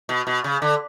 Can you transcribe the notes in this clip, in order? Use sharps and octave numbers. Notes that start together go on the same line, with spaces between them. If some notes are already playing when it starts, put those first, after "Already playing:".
B2
B2
C#3
D3